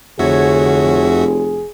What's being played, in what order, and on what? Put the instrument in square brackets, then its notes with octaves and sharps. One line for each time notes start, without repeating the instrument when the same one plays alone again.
[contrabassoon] F1 [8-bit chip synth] F2 F#4 E5 [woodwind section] D3 C#5 [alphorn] G#4